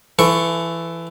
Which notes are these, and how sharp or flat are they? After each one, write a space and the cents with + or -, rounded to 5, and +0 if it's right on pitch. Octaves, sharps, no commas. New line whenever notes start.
E3 +20 A4 +0 C#6 +0